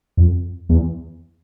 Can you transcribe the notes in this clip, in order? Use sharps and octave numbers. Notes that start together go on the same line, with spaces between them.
F2
E2